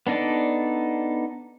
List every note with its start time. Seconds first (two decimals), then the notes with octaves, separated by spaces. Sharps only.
0.07 B3 D4 D#4 A4 D5